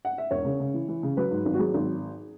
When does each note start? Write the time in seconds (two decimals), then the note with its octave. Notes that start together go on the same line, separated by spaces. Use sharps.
0.05 F#5
0.18 E5
0.31 E1 C#5
0.45 C#3
0.60 C#3
0.74 E3
0.88 E3
1.03 C#3
1.17 F#3 B4
1.31 G#2
1.46 G#1
1.54 F#4
1.59 F#3 G#4
1.74 G#1